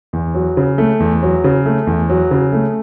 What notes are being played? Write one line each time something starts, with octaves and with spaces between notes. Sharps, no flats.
E2
F#3
C#3
A3
E2
F#3
C#3
A3
E2
F#3
C#3
A3